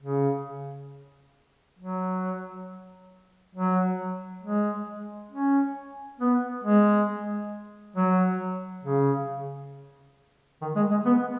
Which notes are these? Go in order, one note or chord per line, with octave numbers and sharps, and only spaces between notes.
C#3
F#3
F#3
G#3
C#4
B3
G#3
F#3
C#3
D#3
G#3
G#3
B3